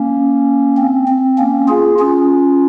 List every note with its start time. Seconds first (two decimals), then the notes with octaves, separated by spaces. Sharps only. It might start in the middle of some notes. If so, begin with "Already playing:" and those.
Already playing: A#3 C#4
0.77 C4
1.08 C4
1.38 A#3 C#4
1.69 F4 G#4
1.99 C#4 F4